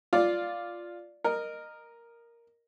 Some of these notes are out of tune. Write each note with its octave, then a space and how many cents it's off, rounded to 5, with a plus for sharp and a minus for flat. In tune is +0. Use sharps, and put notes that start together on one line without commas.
F4 +0 D5 +0
A#4 +0 D#5 -20